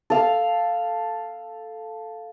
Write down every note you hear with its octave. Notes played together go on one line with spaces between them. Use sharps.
A4 F5